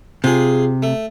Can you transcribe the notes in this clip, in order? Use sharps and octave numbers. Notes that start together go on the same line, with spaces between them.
C3 F4 G#4
A3